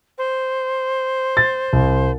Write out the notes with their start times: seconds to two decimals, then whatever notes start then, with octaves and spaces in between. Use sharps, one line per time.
0.18 C5
1.37 A6
1.73 C2